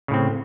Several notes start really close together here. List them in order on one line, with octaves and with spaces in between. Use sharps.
C#3 A2 C4